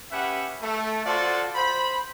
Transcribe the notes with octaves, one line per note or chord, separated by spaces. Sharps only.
C#4 G4 B4 E5 F#5
A3
F4 F#4 A4 C5 D5 F#5
C5 B5